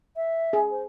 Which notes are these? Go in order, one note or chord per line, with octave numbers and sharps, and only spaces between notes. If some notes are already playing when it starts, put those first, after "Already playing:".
E5
G#4
C5